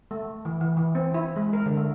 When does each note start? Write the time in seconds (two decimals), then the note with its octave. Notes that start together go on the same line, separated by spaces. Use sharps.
0.11 A3
0.45 E3
0.61 E3
0.77 E3
0.95 C4
1.14 E4
1.36 G#3
1.53 A#4
1.66 D3
1.77 A3